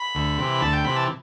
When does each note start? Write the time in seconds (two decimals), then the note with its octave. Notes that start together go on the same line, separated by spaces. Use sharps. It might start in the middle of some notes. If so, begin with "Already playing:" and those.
Already playing: B5
0.15 D2
0.38 C3 E3
0.61 D2 A5
0.73 G5
0.85 C3 E3 B5
0.96 A5